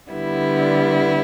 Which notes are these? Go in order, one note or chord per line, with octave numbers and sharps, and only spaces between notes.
D3 G3 B3 E4